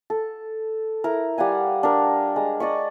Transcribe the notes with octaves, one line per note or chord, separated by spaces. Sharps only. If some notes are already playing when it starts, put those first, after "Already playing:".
A4
E4 A#4
G3 F5 F#5 G#5
D4 A#4
G#3 A#5
D5 D#5 B5 C#6